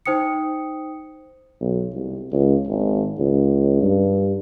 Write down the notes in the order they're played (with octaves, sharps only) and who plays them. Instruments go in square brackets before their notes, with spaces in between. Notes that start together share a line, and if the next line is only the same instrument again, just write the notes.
[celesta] D#4 C5 G5 D#6 C#7
[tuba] B1
C2
C#2
G#1
C#2
G2